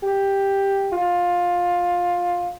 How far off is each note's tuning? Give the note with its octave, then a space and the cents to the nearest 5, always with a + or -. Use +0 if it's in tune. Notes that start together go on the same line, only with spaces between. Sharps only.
G4 +5
F4 +15